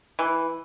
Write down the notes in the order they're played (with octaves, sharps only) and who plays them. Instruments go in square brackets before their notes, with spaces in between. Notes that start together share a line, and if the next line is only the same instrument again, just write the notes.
[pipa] E3